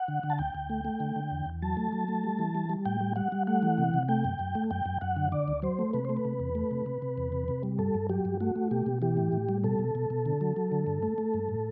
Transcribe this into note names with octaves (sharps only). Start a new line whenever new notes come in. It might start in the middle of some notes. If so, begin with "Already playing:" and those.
Already playing: F#5
D3
D3
A5
D2 G5
D2
A3
A3
D3
D3
E2
E2
F#3 A5
A3
F#3
A3
G3
E3
G3
G3
A2 G5
G3
G3 F#5
G3
A3 F#5
E3
C3
C3
A3 G5
F#2
F#2
A3
F#2 G5
F#2
F#2 F#5
D3
D3 D5
D2
F#3 C5
A3
C3 B4
A3 C5
B4
C3
E2
A3
C3
C3
C3
E2
C3
C3
G3
G2 A4
G2
F#3 G4
G2
A3 F#4
A3
B2 G4
B2
E3 G4
A2
A2
G3
B2 A4
B2
B2
B2
D3
F#3
F#3
D3
G2
A3
A3
G2
A2